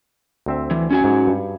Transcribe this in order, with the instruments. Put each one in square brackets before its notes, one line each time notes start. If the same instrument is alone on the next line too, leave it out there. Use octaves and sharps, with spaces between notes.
[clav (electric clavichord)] D2 C4 E5
[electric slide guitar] E3
C#4 F#4 G#5
[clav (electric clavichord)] G#2
G2